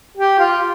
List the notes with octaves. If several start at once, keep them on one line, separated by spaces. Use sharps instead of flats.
G4
F4